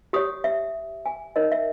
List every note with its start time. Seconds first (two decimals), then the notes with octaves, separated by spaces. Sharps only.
0.13 G4 C#5 D#6
0.44 E5
1.06 G#5
1.36 D#4 A#4 C#5 D#5
1.52 E5